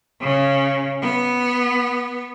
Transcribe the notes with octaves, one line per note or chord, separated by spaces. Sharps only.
C#3
B3